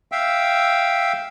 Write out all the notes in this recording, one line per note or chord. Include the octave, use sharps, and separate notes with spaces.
E5 F5 G5 E6